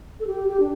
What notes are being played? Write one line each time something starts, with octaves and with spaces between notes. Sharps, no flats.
A4
G4
G4
D4